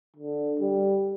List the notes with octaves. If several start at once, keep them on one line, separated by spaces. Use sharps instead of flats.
D3
G3